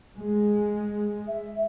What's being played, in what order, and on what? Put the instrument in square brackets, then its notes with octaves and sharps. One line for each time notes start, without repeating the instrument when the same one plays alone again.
[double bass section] G#3
[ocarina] E5